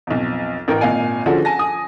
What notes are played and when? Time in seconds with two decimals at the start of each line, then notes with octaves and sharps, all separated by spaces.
0.07 B1 F2
0.68 A1 A#4 G5
0.81 G#1 A#2 D#5 F5 G#5
1.26 D3 F3 C#4 F#4 G#4 A4
1.45 G#5 A5 A#6
1.59 G#5 D#6